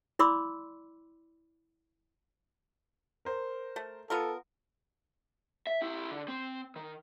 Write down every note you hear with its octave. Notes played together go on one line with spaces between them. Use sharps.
E4 D5 B5 C6 D6 E6
A#4 C5
A3
B3 F4 A4 A#4
E5
E4 G4
D3
C4
D#3